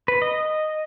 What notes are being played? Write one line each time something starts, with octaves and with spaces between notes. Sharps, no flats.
B4
D#5